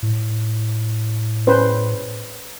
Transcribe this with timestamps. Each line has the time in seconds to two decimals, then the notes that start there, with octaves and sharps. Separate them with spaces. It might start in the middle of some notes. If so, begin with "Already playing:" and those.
0.02 A2
1.47 C#4 B4 C5